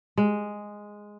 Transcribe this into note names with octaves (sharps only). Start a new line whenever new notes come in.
G#3